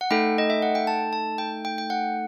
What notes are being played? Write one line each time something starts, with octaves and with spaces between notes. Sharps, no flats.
F#5
A3 D#4 A4 G5
D#5
E5
F#5
G5
A5
A5
G5
G5
G5
F#5